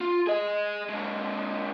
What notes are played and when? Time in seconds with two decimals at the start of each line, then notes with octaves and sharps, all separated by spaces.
0.01 F4
0.27 G#4 D#5
0.90 D3 G#3